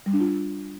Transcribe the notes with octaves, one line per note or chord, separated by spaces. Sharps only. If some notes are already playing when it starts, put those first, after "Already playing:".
G3
D4
F4